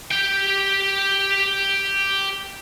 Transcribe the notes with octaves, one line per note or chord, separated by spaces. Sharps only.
G4 G5